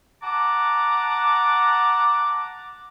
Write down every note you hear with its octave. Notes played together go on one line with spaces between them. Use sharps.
F#5 A5 A#5 D6